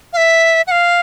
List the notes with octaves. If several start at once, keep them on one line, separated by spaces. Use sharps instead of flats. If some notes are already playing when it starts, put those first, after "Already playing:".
F5
E5
F#5
F5